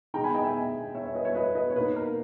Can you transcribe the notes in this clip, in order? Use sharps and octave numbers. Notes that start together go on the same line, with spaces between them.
B2 G#3 D#4 G5 A#5
G#5 B5
D#5 G5
E5 G#5
C#5 E5
C#5 E5
B4 D#5
C#5 E5
B4 D#5
B4 D#5
C#5
B2 A#3 D#4 B4
A#4